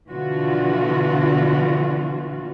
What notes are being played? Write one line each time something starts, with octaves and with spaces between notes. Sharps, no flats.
B2 D3 E3 F3 F4 F#4